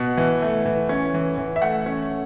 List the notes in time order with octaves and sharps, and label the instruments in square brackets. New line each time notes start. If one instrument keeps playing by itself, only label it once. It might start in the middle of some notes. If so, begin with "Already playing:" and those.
Already playing: [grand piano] B2 F#5
E3
A3
E3
C#4
E3
E3
E5
A3 F#5
C#4